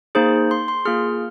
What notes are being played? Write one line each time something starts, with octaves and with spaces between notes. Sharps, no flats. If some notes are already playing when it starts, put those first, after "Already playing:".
A#3 D#4 G#4 C5
C6
C6
A#3 F4 G#4 F6